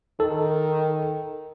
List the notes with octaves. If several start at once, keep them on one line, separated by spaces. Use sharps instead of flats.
D#3 A4